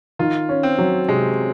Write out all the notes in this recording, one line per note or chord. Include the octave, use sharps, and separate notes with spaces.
D#3 F4
C#4
C4
F#3
C3 G#3